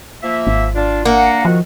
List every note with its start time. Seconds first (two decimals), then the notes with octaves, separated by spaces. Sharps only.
0.23 F3 A#3 E5
0.47 G#1
0.75 D4 F4
1.05 A#3 D4 F#5
1.45 D#3 F3 F#4